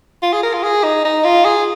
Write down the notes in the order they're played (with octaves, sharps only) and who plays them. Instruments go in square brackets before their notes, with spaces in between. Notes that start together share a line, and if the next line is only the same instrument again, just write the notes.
[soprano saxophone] F4
G#4
A#4
F4
G#4
D#4
D#4
F4
G#4